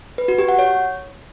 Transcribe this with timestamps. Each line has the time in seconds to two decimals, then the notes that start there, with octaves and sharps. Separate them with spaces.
0.18 B4
0.28 F#4
0.38 G4
0.49 F#5
0.59 C#5